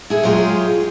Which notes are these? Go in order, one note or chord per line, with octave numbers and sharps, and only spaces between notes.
E4 G#4 A4
F#3 G#3 F4 G4 G#4